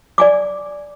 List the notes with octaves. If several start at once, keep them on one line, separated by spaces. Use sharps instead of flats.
D5 G#5 D6